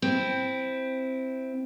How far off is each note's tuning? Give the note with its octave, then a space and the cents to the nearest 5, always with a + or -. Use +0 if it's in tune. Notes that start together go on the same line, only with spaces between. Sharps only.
C4 +0 E4 +0